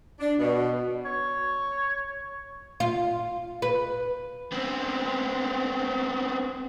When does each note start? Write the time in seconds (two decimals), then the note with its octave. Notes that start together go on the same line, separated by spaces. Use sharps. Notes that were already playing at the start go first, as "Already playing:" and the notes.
0.20 D4
0.39 B2
1.06 C#5
2.80 F4
3.62 B4
4.52 B3 C4